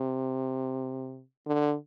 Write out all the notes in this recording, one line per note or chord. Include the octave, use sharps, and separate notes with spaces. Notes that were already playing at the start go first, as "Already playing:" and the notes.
Already playing: C3
D3